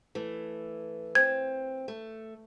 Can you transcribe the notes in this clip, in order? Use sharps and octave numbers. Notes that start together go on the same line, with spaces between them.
E3 A3
C4 G#6
A3